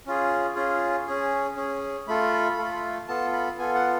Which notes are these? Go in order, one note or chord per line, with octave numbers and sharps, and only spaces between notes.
C#4 F4 G#4
C#4 F4 G#4
C#4 G#4
C#4 G#4
A3 F4 A4 B5
A3 F4 A4
B3 F4 A4 A5
B5
B3 F4 A4 G#5
F#5